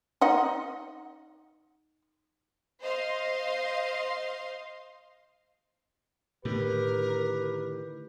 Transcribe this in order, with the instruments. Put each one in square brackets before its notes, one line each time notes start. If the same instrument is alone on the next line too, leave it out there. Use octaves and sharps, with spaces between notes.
[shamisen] D#4 D#5 F#5
[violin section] C5 D#5 F5 C6
[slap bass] A2 D3 D#3 [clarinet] G4 [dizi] A#4 [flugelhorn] B4